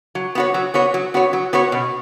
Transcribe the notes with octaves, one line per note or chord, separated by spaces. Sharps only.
F#3
B3 F#4 C#5
F#3
B3 F#4 C#5
F#3
B3 F#4 C#5
F#3
B3 F#4 C#5
B2